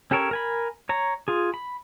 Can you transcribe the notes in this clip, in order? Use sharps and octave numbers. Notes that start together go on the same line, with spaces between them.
C#4 G4 A4 A#4 C#5
A#4 G#5 B5
C#5 A#5
F4 G#4
B5